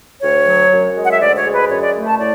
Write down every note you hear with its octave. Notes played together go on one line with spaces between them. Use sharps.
D2 C#5
F#3
F#2
G#3
F#5
E5
D2 D5
C#5
G#3
B4
F#2 C#5
D5
A3
A5
A2 D5